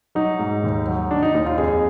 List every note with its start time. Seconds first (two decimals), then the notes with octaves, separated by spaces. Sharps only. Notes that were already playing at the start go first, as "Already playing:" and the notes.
0.15 F#3 D#4
0.39 G#2
0.64 D#2
0.88 F#3
1.11 D#3 D4
1.23 D#4
1.34 D#2 D#4
1.46 F4
1.58 F2 G#4